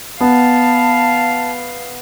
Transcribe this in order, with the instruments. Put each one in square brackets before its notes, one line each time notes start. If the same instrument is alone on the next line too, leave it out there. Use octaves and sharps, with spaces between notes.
[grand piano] B3 [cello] F5 [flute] A5